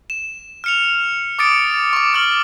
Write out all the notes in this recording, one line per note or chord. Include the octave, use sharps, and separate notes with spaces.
E7
F6 C#7 F7
D6 D#6 A6 C#7 D7
C#6 D6
C#6 F6 F#7